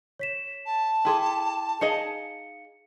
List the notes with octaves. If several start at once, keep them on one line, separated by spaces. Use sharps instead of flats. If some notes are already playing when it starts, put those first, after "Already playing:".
C#5 B6 E7
A5
E4 G#4 A4 G5 C6 D6
D#4 G#4 D#5 F5 C#7